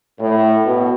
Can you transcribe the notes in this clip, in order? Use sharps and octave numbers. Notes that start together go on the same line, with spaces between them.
A2
B2